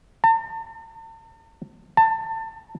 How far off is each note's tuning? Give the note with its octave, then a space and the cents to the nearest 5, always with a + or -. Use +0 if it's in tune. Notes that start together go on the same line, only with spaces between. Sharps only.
A5 +45
A5 +25